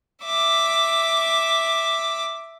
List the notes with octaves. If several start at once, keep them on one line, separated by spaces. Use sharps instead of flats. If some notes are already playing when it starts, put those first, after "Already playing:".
E5 D6